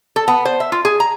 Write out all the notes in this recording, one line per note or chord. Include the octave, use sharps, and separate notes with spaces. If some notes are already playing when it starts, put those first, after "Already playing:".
A4
B3
C5
E5
F4
G#4
A#5